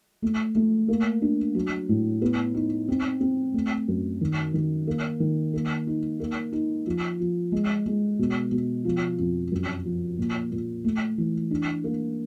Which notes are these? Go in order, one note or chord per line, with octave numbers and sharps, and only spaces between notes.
A3
A3
A#3
D4
F#3
A2
B3
D#4
C4
C4
A3
F#2
D#3
D#3
A#3
D#3
A#3
D#4
A#3
D#4
F3
F3
G#3
G#3
B2
B2
F3
F2
F#2
F3
A#2
A#2
A3
E3
D4
A#3